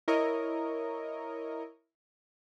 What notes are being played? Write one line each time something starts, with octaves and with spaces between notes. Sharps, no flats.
E4 A#4 C#5 D#5